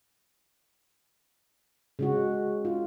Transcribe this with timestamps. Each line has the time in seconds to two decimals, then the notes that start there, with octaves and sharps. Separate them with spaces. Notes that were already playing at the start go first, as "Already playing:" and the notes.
1.99 C#3 G#3 F#4
2.65 F4